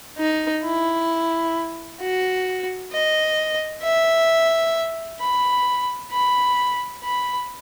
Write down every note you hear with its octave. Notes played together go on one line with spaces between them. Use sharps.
D#4
E4
F#4
D#5
E5
B5
B5
B5